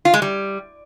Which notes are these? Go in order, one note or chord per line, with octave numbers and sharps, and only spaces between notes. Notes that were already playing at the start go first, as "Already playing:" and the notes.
F4
G#3
G3